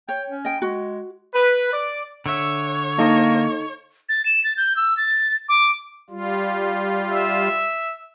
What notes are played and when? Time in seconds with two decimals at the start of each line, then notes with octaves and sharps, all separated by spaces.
0.09 C#5 G5
0.30 C#4
0.45 D#5 G5
0.62 G#3 F#4
1.34 B4
1.72 D5
2.26 D3 C#5 E5
2.98 A#3 D#4 A4 D#5
4.09 A6
4.26 E7
4.44 A6
4.57 G6
4.76 E6
4.97 A6
5.49 D6
6.10 G3 F4
7.10 E5